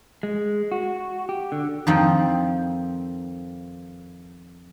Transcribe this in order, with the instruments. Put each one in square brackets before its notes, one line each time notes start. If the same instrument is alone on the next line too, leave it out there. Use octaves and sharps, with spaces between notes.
[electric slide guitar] G#3
F#4
G4
D3
[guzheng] F2 D#3 F3 C4 D#4